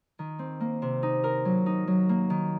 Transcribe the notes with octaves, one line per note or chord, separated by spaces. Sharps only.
D#3
C4
A#3
C3
D#4
A#4
F#3
D#4
F#3
A#3
D#3